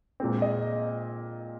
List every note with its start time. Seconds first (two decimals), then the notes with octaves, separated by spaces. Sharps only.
0.20 A#2 G#3 C4
0.42 D#5